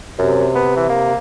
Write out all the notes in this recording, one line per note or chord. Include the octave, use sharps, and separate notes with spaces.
F#2 C3
B3
E3
A#3